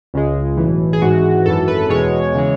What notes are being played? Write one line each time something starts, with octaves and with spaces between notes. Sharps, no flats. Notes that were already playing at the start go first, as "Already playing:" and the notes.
C#2 C#3 G#3
B1 A2 E3
G#4
G#1 G#2 E3 G#3 F#4
G#1 F#2 E3 A4
B4
E2 B2 G#3 C#5
C#3 E3 G#3